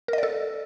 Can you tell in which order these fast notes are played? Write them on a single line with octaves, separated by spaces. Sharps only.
A#4 D#5 D5 A4